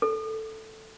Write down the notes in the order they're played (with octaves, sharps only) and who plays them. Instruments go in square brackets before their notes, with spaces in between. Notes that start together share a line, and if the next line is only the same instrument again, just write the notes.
[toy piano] A4